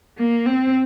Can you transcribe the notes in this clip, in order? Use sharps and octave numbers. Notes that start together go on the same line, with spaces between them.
A#3
C4